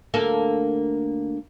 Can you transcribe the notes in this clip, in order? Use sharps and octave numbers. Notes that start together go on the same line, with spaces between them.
D2 A#3 A4